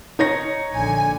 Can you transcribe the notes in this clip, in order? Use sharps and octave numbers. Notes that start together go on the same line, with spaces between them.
D#4 C#5 A#6
A#1 D3 G#5